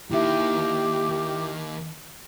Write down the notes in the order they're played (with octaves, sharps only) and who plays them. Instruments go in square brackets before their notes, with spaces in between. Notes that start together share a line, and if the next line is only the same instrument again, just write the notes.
[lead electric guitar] D#2 D#3 [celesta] E4 E5 [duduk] G4